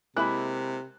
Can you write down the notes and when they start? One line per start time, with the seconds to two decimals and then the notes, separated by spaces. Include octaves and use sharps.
0.17 C3 G#3 A#3 E4 B5 F#6